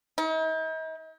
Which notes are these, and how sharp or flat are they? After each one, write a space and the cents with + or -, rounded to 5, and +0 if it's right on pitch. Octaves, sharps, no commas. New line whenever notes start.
D#4 +45